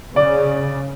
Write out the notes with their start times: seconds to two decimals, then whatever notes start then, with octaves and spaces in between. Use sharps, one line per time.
0.16 C#3 D5